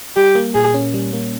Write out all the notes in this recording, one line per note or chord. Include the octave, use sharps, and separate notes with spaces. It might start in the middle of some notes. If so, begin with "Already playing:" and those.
G3 G4
A#3
A#2 G#4
C#4
G3
A#3